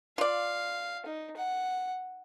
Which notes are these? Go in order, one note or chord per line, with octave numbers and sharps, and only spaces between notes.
F4 D5 F5
D#4
F#5